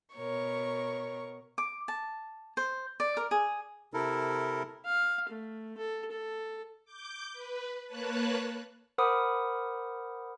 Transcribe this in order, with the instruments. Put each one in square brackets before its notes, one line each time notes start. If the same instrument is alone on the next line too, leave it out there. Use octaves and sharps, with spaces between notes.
[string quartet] B2 A#4 C#5 C#6
[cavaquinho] D6
A5
C5
D5
A#4
G#4
[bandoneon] C3 E4 A4 A#4
[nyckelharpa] F5
A3
A4
A4
[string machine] D6 G6
B4
A#3 B4 C#5 A5 F#6
[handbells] A#4 C5 F#5 B5 D6 D#6